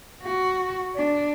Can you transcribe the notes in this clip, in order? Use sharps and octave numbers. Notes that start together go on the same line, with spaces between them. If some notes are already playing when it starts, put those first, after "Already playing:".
F#4
D4